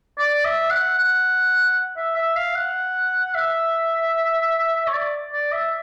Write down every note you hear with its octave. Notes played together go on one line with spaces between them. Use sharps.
D5
E5
F#5
F#5
E5
E5
F5
F#5
E5
C#5
D5
D5
E5